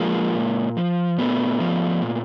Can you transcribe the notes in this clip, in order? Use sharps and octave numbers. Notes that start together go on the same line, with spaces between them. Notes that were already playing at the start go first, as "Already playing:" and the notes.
Already playing: F3 G#3 A#3
A#2
F3
A#2 A3 B3
F3
A#2